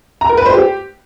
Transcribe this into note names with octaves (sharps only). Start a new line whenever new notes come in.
A#5
A#4
B4
C5
G4